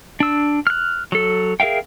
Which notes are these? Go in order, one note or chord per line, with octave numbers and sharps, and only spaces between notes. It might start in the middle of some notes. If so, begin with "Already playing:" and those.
D4 E6
F6 F#6
F#3 A4
G#4 A#4 E5 F5 G5